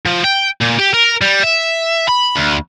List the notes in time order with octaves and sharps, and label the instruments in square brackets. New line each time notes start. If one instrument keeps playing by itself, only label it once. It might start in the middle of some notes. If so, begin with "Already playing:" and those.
[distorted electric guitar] F3
G5
A#2
G4
A#4
G3
E5
B5
D2